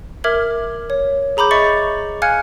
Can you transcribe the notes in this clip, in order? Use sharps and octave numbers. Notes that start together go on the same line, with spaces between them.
A#4 E5 D6 F6 G#6 F#7
C#5
G#4 A#5 B5 D6 G6
D#5 E5 C#6 A6 C#7
F5 G#5 F6 F#6 G#6 C#7